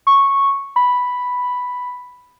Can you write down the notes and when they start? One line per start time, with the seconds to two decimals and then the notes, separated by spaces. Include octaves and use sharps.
0.07 C#6
0.76 B5